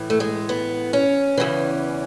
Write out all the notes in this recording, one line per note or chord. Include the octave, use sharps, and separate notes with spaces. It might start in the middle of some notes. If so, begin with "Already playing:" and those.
Already playing: A2 E3
A3
G#3
B3
C#4
E2 C#3 E3